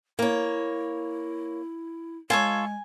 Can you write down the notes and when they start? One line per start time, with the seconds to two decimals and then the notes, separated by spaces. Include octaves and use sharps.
0.19 A#3 E4 C#5
2.30 G#3 F4 A4 C#5 G#5